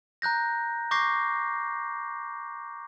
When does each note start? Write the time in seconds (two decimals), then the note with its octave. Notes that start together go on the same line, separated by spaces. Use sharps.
0.22 A#5 F#6 G6 A#6
0.91 C#6 D6 G6 A#6 C7